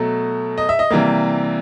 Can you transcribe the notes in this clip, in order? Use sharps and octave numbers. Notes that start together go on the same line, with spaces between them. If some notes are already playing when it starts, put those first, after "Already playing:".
Already playing: B2 F#3 A3
D#5
E5
D#5
C3 E3 G3 A#3